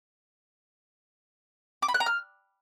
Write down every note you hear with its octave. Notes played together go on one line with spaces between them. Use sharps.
D6
B5
F#6
A#5
F6